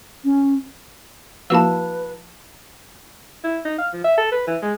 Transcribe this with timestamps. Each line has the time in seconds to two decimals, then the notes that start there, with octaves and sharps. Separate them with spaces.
0.24 C#4
1.50 F3 A#3 E4 F#4 B4 F5 A5 E6
3.44 E4
3.65 D#4
3.78 F5
3.93 F3
4.04 E5
4.18 A4
4.32 B4
4.47 E3
4.62 G#3